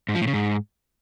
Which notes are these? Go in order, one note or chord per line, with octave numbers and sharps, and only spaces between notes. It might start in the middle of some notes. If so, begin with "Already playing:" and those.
G#2
F3
A2
C#3
G#2